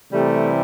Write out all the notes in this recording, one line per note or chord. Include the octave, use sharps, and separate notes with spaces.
C3 E3 G3 A3